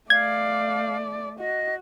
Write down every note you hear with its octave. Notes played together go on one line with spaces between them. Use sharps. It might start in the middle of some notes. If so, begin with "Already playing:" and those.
A3 D5 F5 G#6
F#4 D#5